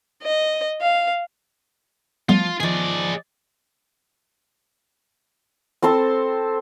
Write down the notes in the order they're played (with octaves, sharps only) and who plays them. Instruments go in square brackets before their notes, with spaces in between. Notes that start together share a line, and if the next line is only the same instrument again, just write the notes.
[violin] D#5
F5
[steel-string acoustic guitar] F3 [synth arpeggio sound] G3 A3 B3 [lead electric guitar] F4
[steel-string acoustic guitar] D#3 F3 [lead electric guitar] G#4 D5
[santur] C4 A4 C5 A5